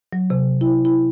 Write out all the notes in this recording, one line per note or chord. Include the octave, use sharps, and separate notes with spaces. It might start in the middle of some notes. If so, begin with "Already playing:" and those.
F#3
C3
E4
E4